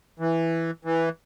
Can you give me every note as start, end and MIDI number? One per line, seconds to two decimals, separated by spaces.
0.19 0.71 52
0.85 1.09 52